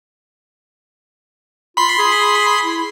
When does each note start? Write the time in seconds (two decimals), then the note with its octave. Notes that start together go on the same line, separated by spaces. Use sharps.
1.77 F4 B5 C6
1.98 G#4
2.64 E4